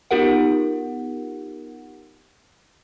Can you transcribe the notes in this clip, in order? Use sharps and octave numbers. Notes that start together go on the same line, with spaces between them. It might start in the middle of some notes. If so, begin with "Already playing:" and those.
B3 D#4 F4 G4 A#4 F#5